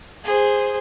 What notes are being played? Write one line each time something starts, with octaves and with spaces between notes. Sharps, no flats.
G#4 C5